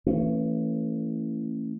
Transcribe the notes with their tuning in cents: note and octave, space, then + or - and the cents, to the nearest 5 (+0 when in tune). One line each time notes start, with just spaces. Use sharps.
E3 +0 A3 +35 C#4 -10